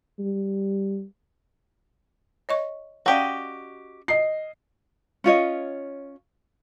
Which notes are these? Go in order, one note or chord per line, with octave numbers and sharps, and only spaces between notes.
G3
C#5 D#5 C#6
C#4 F#4 G4 D5 D#5 F5
D#5 C7
C#4 F4 C#5 D#5